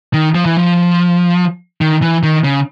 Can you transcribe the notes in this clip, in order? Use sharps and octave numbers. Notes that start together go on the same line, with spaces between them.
D#3
F3
E3
F3
D#3
E3
D#3
C#3